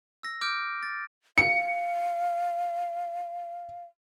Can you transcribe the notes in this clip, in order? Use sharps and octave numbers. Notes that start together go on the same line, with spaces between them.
E6 A#6
D6 F6 G6 D7
A6
F5 C#7